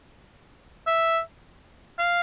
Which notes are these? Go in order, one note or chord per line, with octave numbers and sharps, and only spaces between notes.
E5
F5